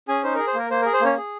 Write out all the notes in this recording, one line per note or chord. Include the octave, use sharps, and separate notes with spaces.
C#4 G#4 G#5
D#4 C5
G#4 A#4
C5
A#3 A#4
A#3 C5
G#4 A#4
C5
A#3 C#4 C#5
G#4